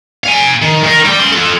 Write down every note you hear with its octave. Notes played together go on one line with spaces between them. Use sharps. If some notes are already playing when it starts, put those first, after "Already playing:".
F5 G#5
D#3
D#3 A#4
G3 G4
C#4 C6
F4 A4